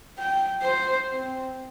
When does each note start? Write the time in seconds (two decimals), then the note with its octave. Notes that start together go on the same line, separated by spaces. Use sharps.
0.18 G5
0.62 C5
1.08 C4